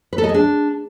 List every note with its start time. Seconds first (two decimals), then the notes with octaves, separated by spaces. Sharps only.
0.13 B4
0.18 A4
0.24 D#5
0.29 G#4
0.34 D4